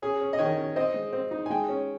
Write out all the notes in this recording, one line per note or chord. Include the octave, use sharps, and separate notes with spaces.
C#4 G#4
C#4
D#5
D#3 C#5
C#4
C4 D#5
G#3
C4
D#4
G#5
G#3 G5
C#4